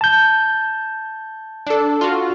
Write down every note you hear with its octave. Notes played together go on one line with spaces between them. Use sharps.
A5 G6
D4 A4
F4 F#4